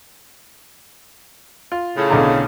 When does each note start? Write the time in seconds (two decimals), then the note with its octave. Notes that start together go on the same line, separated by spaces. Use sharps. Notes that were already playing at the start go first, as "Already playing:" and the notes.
1.72 F4
1.96 A2 C#3
2.10 B1 D3 A#5